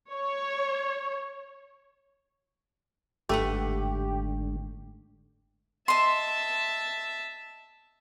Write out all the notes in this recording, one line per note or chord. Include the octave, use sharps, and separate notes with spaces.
C#5
G1 G#2 D3 A3 G4 B4 F#5
D#5 E5 A5 C6